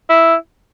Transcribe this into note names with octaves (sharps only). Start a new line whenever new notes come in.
E4